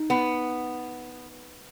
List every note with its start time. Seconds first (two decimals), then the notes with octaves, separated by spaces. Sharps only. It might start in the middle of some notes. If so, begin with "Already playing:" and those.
Already playing: D#4
0.10 B3